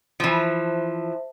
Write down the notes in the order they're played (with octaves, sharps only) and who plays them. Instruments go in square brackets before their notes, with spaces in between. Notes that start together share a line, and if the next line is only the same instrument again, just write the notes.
[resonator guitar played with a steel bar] E3 F3 [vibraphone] C5 E5 A5